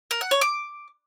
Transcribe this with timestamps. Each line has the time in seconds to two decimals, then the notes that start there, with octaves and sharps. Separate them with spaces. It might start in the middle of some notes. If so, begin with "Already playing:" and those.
0.11 A#4
0.21 F#5
0.31 C#5
0.41 D6